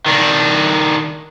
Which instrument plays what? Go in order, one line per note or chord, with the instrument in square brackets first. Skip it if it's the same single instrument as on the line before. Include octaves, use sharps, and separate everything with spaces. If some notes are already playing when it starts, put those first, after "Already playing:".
[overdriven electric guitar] D#3 D4